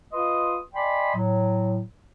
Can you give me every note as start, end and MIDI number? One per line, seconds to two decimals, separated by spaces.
0.12 0.57 65
0.12 0.57 71
0.12 0.57 75
0.12 0.57 84
0.12 0.57 87
0.74 1.12 74
0.74 1.12 75
0.74 1.12 79
0.74 1.12 80
0.74 1.12 83
0.74 1.12 84
1.15 1.81 45
1.15 1.81 54